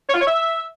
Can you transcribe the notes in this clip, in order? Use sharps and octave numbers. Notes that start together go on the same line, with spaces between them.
C#5
F4
C#5
E5